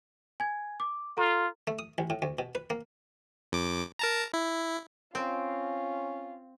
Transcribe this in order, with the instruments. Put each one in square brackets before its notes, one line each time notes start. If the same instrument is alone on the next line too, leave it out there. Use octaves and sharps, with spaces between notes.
[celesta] G#5 G#6
D6
[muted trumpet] F4 [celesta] A4 A#5
[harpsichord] A3
D#6
A1
A2
D2
B2
B4
A#3
[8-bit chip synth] F2 D6
A#4 A5 A#5
E4
[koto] C4 [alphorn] C#4 [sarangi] F4